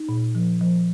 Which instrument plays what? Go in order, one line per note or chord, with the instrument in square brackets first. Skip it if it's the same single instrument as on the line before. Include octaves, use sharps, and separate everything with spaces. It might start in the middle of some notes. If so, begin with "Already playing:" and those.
Already playing: [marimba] D#4
A#2
F3
F3